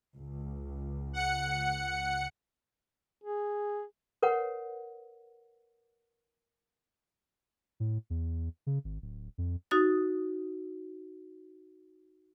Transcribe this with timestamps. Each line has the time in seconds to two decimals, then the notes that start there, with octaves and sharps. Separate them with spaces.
0.16 C#2
1.13 F#5 C#7
3.24 G#4
4.23 A#4 B4 C#5 F#5
7.80 A2
8.10 E2
8.67 C#3
8.84 G#1
9.02 D1
9.38 F2
9.71 D#4 F#4 D#6 A6